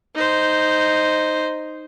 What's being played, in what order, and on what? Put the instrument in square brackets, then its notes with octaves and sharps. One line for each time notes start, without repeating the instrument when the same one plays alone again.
[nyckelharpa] D#4 C5